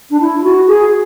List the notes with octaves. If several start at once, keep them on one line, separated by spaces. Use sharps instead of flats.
D4
E4
E4
F#4
G#4